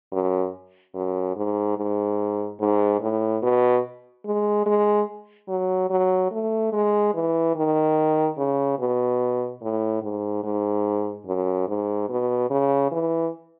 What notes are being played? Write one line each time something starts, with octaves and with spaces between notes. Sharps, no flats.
F#2
F#2
G#2
G#2
G#2
A2
B2
G#3
G#3
F#3
F#3
A3
G#3
E3
D#3
C#3
B2
A2
G#2
G#2
F#2
G#2
B2
C#3
E3